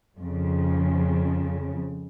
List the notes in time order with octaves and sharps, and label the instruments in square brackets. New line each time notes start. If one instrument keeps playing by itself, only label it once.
[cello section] F2 C#3